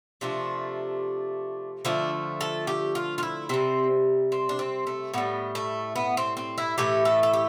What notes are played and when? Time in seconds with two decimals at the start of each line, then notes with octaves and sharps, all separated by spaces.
0.21 C3 F3 A3 D4
1.85 D3 F3 A3 D4
2.41 A4
2.67 G4
2.95 F4
3.18 F4
3.23 E4
3.49 C3 G3 C4
4.32 C4
4.49 D4
4.59 C4
4.87 A3
5.14 A2 G3 B3
5.55 A3
5.96 B3
6.17 C4
6.37 C4
6.58 E4
6.78 A2 E3 A3 G4
7.05 A4
7.23 A4
7.33 G4